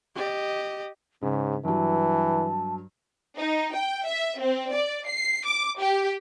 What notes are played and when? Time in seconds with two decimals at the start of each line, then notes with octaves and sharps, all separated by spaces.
0.15 G4 D#5
1.23 G#2 C#3 C#4
1.64 G2 E3 F#3 A5
3.37 D#4
3.74 G5
4.06 E5
4.40 C4
4.72 D5
5.08 C7
5.46 D6
5.80 G4